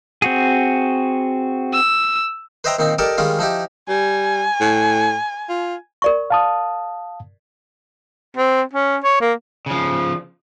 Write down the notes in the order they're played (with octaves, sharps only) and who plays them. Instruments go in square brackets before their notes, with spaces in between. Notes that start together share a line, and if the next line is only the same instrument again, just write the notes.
[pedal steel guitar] C4 F#4 G#4
[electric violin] E6
[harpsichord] B4 C5 D#5 E5 G5 A#5
A#2 D#3 C4 D#4
G4 A4 A#4 D5 D#5 A5
D#3 G3 G#3 C#4 F4
F3 D#4 E4 G4
[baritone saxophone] G3 [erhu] G#5
[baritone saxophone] A2
F4
[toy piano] A#4 D5 C#6
[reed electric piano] F5 A5 D#6
[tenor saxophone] C4
C#4
C#5
A#3
[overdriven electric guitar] C#3 F3